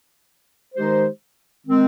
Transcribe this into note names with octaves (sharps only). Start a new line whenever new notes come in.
D#3 G#3 D#4 G4 C5
D#3 G#3 C4